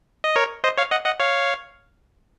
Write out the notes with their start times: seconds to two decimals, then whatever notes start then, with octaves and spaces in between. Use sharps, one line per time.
0.24 D#5
0.36 A#4 C#5
0.64 C5 D#5
0.78 C#5 F5
0.91 D#5 F#5
1.06 D#5 F#5
1.20 C#5 F5